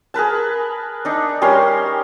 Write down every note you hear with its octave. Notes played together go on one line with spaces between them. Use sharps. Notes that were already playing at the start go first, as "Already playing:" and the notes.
G#4 A#4 B4 A5
D4 D#4
G3 C#4 A#4 C6